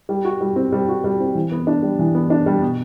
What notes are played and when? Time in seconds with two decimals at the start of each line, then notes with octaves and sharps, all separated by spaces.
0.09 G3
0.25 F#4
0.41 G3
0.56 C4
0.72 G3
0.88 F#4
1.04 G3
1.20 C4
1.35 E3
1.52 B3
1.67 D4
1.83 G3
1.99 E3
2.15 B3
2.30 D4
2.46 G3
2.62 B2